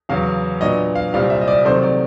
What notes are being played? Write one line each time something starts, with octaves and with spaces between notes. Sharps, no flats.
E2 C#3 F#3 F5
A#2 F#3 B3 D4 D#5
F5
C2 A#2 G3 C4 F5
E5
D#5
D5
C3 D#3 F#3 A3 C5
D5